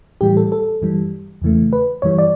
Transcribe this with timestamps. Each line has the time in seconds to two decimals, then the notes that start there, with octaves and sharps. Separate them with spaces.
0.21 A2 E3 G3 G4
0.37 A4
0.52 A4
0.82 G2 E3 G3
1.42 E2 C#3 E3 A3
1.73 B4
2.02 G2 E3 G3 C#5
2.19 D5